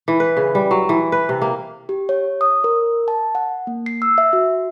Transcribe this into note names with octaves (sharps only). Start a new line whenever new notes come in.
E3
B4
C#3
G3
F#3
E3
B4
C3
A#3
G4
C#5
D#6
A#4
A5
F#5
A#3
C7
E6
E5
F#4